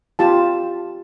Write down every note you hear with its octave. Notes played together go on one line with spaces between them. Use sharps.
F4 G4 A5